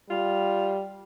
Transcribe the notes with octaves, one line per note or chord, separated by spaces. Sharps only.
G3 F4